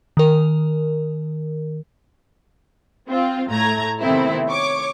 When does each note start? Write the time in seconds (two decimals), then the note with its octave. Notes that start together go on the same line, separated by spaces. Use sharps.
0.17 D#3 A#4
3.08 C4 F4
3.48 A2 A3 A#5 G#6
4.01 C3 D#3 A3 B3 C4 E4
4.48 C#5 C#6 D6